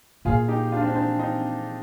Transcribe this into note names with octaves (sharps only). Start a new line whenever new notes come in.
A#2 F4 G#4
D#4 G4
D4 F4
C4
D4
C4 D#4
C4 D#4